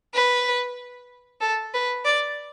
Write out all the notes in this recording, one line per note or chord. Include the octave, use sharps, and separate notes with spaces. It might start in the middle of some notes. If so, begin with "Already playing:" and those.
B4
A4
B4
D5